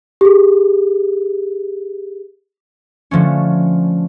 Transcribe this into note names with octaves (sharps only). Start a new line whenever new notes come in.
G4 G#4
D3 F3 A3 C#4